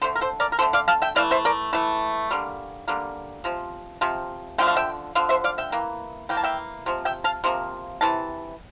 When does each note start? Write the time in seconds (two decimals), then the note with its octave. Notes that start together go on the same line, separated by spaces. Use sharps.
0.02 D3 A3 A4 C5
0.15 A#4
0.21 A4 C5
0.40 A#4 D5
0.52 A#4
0.59 D3 A3 A4 C5
0.73 D5 F5
0.88 F5 A5
1.02 E5 G5
1.16 E3 A3 D5 F5
1.31 C5 E5
1.45 A#4 D5
1.73 E3 A3
2.31 D3 G3 A#3
2.88 D3 G3 A#3
3.44 C3 F3
4.01 C3 F3
4.58 D3 F3 A3 G5
4.68 F5
4.76 E5 G5
5.15 D3 F3 F5
5.29 C5 E5
5.44 D5 F5
5.58 E5 G5
5.72 E3 A#3
6.29 E3 A#3 G5
6.37 A5
6.43 E5 G5
6.86 C3 F3
7.05 E5 G5
7.24 F5 A5
7.44 C3 F3 A#3
8.01 C3 E3 A5